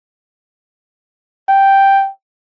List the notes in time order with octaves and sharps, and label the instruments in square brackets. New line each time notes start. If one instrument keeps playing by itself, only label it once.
[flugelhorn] G5